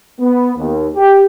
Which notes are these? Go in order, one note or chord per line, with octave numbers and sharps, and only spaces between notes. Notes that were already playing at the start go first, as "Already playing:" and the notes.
B3
D#2
G4